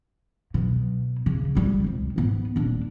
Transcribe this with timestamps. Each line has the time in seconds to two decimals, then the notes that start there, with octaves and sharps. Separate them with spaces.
0.54 B2 F#3
1.26 C#3
1.55 C#2 G3
1.84 C#2 C3
2.16 G#2 B3
2.56 D#1 D4